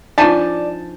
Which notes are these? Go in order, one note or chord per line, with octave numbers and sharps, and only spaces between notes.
F3 D4 D#4 F4 D5 G#5 A5